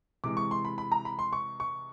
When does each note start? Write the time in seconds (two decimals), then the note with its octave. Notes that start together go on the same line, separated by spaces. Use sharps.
0.24 C3 E3 G#3 D6
0.37 C#6
0.51 C6
0.65 B5
0.78 B5
0.92 A#5
1.05 B5
1.19 C6
1.33 C#6
1.60 C#6